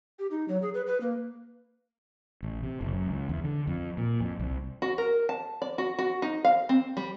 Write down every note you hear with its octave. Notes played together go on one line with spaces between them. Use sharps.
G4
D#4
F#3
G#4
B4
B4
A#3
A1
C3
F#1
F#2
C#2
E2
D3
F2
A#2
F2
C2
F#4
A#4
A5
D5
F#4
F#4
D#4
F5
C4
G3